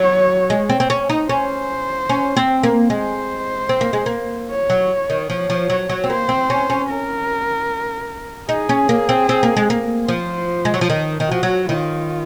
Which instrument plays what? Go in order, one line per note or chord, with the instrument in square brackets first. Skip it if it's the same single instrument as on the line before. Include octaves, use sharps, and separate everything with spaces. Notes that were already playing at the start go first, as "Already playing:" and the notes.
Already playing: [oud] F#3 [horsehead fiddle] C#5
[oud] G#3
C4
C4
C#4
D#4
[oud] C#4 [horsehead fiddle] C5
[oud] C#4
C4
A#3
[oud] G#3 [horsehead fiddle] C5
[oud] C4
A#3
G#3
A#3
[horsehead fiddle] C#5
[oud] F#3
D#3
[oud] F3 [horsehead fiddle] C#5
[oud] F3
F#3
F#3
C4
[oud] A#3 [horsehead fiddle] C5
[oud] C4
C#4
C#4
[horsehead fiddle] A#4
[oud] D#4 [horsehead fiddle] G#4
[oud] C#4
A#3
C4
C4
A#3
G#3
A#3
[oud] F3 [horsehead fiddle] C5
[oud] G#3
F#3
F3
D#3
D#3
[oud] F3 [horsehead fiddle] F#4
[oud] F#3
[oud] D#3 [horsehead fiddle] F4